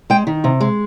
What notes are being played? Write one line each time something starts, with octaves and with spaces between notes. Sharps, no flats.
G#3 G5
D#3
C3
G#3